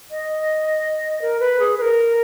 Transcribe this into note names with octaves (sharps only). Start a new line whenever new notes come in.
D#5
A#4
B4
G#4
B4
A#4